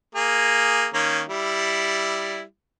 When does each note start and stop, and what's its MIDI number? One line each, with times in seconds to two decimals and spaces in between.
0.15 0.87 58
0.15 0.87 68
0.94 1.22 51
0.94 1.22 58
0.94 1.22 61
1.28 2.42 55
1.28 2.42 64